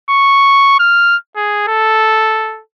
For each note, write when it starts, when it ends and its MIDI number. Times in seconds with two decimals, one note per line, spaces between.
0.10 0.79 85
0.80 1.16 89
1.36 1.64 68
1.67 2.61 69